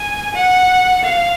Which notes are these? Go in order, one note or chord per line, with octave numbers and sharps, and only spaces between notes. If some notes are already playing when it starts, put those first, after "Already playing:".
Already playing: G#5
F#5
F5